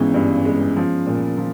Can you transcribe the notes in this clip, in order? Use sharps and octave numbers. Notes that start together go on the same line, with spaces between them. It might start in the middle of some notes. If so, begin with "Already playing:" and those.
Already playing: G#1 E3 G#3 B3 C#4
G2
G#3
F3
A#2
F3